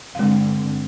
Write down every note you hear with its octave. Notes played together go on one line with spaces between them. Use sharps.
G2 D3 G#3 C4 F5